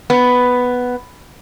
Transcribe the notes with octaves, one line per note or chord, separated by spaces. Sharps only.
B3